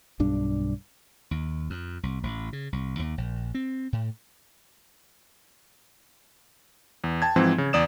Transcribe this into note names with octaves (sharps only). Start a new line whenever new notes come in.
B1 G2 D4
D#2
F2
C2
A1
C#3
C2
D#2
A#1
C4
A2
E2
G5 A5 G#6
G#2 E3 F3 C4
C#3
E2 D5 D#6 E7